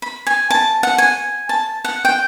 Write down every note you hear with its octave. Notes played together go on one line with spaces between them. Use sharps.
B5
G#5
A5
F#5
G#5
A5
F#5
G5